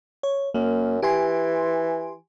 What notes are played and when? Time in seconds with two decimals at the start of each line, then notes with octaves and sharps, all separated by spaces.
0.23 C#5
0.54 F#2 A#3
1.02 E3 G4 G#5 C6